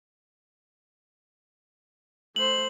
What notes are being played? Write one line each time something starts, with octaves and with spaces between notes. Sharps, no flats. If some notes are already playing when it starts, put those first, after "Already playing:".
A3 C5 F#7